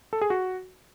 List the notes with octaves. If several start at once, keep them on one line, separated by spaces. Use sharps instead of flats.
A4
G#4
F#4